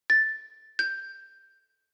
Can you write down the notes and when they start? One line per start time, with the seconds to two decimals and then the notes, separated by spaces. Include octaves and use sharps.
0.10 A6
0.79 G6